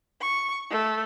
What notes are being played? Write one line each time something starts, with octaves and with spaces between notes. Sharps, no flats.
C#6
A3